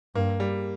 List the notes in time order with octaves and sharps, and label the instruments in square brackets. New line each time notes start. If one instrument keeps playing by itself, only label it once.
[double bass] G2 [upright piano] A#3
[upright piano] G3